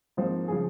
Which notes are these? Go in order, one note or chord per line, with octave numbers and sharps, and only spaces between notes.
G#2 F3 A#3 C4 C5
C#3 F3 G#4